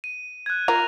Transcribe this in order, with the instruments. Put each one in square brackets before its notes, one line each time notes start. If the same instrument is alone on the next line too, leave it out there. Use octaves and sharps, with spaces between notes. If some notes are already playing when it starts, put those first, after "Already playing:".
[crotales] D#7
F#6 G#6
[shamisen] F4 A#4 [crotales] A#6 F7